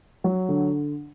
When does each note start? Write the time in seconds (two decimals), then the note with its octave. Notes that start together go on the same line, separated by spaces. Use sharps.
0.24 F#3
0.49 D3